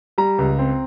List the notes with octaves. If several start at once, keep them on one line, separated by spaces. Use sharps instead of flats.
G3 A#5
C#2
C4